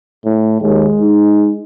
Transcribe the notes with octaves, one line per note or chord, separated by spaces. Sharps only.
A2
D#2 G#3
D#4